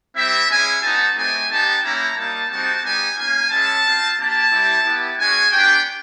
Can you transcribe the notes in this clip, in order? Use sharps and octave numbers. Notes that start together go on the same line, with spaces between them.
G3 C4 E4 E5
G#3 C#4 E4 G#5
B3 D#4 F#4 A5
A3 C4 D#4 G4 G#5
B3 D#4 G4 A5
A#3 C#4 E4 G4 A#5
G3 A#3 D#4 A5
G3 C4 D#4 F#4 A5
G3 B3 D#4 G4 G#5
A#3 C#4 F4 G#5
G#3 C#4 E4 A5
C4 F4
A#3 D4 G4 A5
G3 C4 E4 G4
B3 E4 G4
G#3 C#4 F#4 G#5
B3 D4 G4 G5